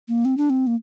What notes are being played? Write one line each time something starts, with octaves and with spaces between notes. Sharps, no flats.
A#3
C4
D4
C4
A#3